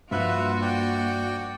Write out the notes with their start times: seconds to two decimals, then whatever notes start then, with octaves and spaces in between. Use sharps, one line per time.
0.11 G2 F3 A#3 F4 F#4 B4 E5 F#6
0.62 D5 G5